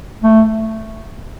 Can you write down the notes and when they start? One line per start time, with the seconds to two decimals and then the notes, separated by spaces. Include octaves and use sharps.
0.23 A3